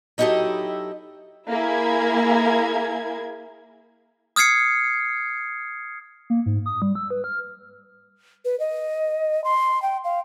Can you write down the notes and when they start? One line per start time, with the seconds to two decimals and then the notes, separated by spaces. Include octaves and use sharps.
0.18 F#3 D#4 E4 G4 A4 D#5
1.50 A#3 E4 G#4 G#6
4.36 D#6 F6 G#6 C7 C#7
6.30 A#3
6.46 G#2
6.66 D#6
6.82 G3
6.95 E6
7.10 B4
7.24 F6
8.45 B4
8.60 D#5
9.44 C6
9.82 G5
10.04 F5